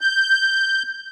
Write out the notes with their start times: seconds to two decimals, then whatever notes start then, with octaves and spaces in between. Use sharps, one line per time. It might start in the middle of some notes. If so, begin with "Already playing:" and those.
0.01 G6